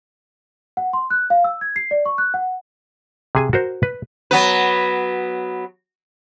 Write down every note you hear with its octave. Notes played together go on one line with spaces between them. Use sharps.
F#5
C6
F#6
F5
E6
G#6
C7
D5
C#6
F#6
F#5
C3 G#4 G#5
F#4 A#4 C5
B4
F#3 B3 B4